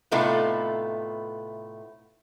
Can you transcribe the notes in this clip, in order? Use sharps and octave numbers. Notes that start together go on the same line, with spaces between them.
A2 C3 A3 B3 D#4 F4